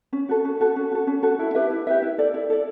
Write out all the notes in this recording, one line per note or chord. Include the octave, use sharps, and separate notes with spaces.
C#4
F#4 A4
C#4
F#4 A4
C#4
F#4 A4
C#4
F#4 A4
E4
G4 B4 E5
E4
G4 B4 E5
E4
A4 D5
E4
A4 D5